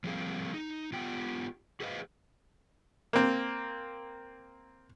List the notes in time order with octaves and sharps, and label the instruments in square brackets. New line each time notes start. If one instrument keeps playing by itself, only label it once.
[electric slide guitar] F3 G3 A#3 C4 G#4 F5
D#4
B3 F4 G4 G5
F#4 G#4 B4 C5 D#5 F5
[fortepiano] A#3 C4